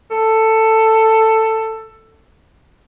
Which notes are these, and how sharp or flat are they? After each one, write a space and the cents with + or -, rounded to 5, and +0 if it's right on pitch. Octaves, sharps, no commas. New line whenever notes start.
A4 +15